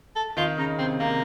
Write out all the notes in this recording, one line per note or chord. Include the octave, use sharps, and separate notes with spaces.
A4
D#3 F4
C#3 D#4
C3 C4
C3 A#3